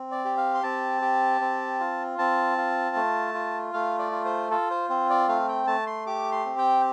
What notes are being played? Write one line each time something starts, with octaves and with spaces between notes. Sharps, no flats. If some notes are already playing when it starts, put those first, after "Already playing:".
Already playing: C4
D5
G4
F5
C6
C4 A5
G4
C4
F4
C4 A5
F4
A3
F4
A3 F5
D5
F4
C5
F4 A4
C5
C4 C5
D5
A3 F5
G5
A3 A5
C6
G4 D6
C6
C4
G5